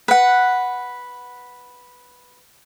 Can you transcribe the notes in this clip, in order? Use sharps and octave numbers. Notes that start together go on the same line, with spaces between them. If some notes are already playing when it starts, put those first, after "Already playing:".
B4 F#5